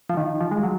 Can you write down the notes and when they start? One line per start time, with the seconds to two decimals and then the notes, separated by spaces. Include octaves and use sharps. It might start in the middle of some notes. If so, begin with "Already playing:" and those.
0.10 F3
0.17 D#3
0.41 F3
0.51 G#3
0.63 F#3